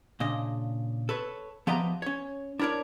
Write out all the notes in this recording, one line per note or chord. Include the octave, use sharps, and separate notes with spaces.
A#2 C#3 D4 D#5
A4 B4 C#5
F3 B3 G4 D#5 E5 A#5
C#4 C#5
D4 E4 A#4 C#5 D5